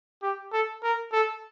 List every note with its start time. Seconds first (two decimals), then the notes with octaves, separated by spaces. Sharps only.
0.23 G4
0.53 A4
0.83 A#4
1.13 A4